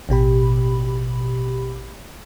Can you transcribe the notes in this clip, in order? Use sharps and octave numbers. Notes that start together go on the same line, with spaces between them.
A1 B2 G4 B5